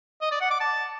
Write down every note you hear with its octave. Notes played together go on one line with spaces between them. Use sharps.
D#5
D5
F#5
D6
A5